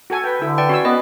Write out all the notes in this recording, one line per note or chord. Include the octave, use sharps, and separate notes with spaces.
F#4 A4 G#5
B4 G5
D3 E4 A4
B4 D5 G5
C#4 F#4 G#5 E6
B3 B4 D#5